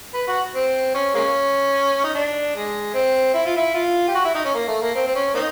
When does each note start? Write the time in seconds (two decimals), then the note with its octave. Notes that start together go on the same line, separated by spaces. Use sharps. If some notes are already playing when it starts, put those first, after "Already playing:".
0.14 B4
0.28 F#4
0.54 C4
0.94 C#4
1.15 G#3 A#3 C#4
2.04 D#4
2.15 D4
2.55 G#3
2.94 C4
3.34 E4
3.46 F4
3.57 E4
3.74 F4
4.08 G4
4.15 F#4
4.25 E4
4.35 D#4
4.45 C#4
4.55 A#3
4.68 A3
4.82 A#3
4.95 C4
5.07 C4
5.15 C#4
5.34 A#3 C4 D#4